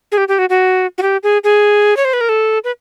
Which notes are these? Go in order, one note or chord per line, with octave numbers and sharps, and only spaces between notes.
G#4
G4
G4
F#4
F#4
F#4
G4
G#4
G#4
C#5
C5
B4
A#4
A4
B4